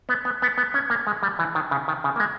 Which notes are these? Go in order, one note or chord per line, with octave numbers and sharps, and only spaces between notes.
B3
B3
B3
B3
C#4
A#3
G#3
G3
E3
D#3
C#3
D#3
C#3
A#3
G#3